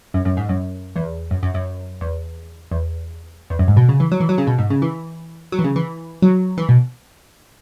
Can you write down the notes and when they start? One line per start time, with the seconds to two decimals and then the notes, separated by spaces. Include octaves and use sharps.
0.14 F#2
0.25 F#2
0.37 G#2
0.49 F#2
0.96 E2
1.31 F#2
1.43 F#2
1.54 F#2
2.01 E2
2.71 E2
3.50 E2
3.59 F#2
3.68 G#2
3.77 B2
3.89 C#3
4.00 E3
4.12 F#3
4.20 E3
4.29 F#3
4.38 C#3
4.47 B2
4.58 G#2
4.70 C#3
4.82 E3
5.52 F#3
5.59 E3
5.64 C#3
5.76 E3
6.22 F#3
6.58 E3
6.69 B2